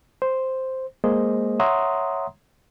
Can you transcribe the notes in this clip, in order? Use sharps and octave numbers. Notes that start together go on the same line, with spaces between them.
C5
G#3 A#3 G#4 C5 D#5
C#5 E5 F#5 A#5 C6 D#6